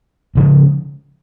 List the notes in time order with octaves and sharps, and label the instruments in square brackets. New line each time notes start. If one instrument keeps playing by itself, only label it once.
[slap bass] D2 C#3 F3 G#3